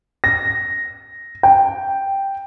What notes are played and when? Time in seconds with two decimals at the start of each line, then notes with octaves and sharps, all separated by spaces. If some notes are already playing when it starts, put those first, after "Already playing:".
0.24 A#6
1.43 G5